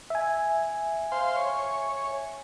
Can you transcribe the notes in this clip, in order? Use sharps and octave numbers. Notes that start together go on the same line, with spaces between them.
E5 G#5
C5 F5 C6
C#5